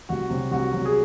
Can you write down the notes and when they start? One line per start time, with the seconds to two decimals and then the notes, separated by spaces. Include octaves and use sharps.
0.09 C2 F#4
0.30 C3 F#3
0.51 C2 F#4
0.72 C3 F#3
0.85 G#4